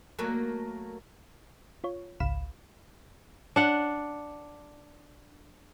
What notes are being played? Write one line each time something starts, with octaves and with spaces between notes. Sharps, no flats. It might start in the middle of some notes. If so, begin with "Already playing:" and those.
F#3 A3 A#3
F4 C#5
G#1 C#2 F5 B5 E7
D4 F#5